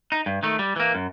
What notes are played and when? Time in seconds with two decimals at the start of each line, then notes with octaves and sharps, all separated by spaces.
0.12 D#4
0.26 G2
0.43 D#3 A3
0.59 G3
0.76 E3 A#3
0.95 F#2